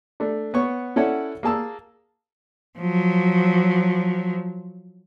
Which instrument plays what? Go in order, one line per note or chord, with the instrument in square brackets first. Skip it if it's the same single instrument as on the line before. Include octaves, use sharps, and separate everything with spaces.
[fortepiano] A3 D4
B3 C#5 C#6
C#4 E4 A4 C#5 D5 F#5
A#3 G#4 A5 E6
[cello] F3 F#3